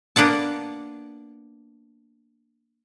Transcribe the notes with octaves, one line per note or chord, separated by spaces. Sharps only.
A#3 B3 D4 F#5 A5